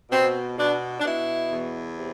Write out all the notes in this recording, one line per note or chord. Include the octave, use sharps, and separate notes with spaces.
B2 C4
B2 D4
D4
B2 E4
E2
C3